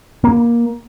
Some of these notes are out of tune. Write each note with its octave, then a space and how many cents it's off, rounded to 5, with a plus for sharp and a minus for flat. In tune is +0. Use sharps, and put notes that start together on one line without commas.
A#3 +15